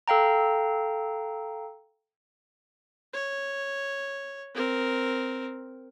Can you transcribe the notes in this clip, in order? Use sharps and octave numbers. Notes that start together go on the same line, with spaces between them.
A4 F5 G5 A#5
C#5
C4 A#4